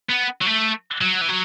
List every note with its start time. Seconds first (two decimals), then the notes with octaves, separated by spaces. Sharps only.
0.10 B3
0.42 F#3
0.46 A3
1.01 F#3
1.21 E3
1.28 F#3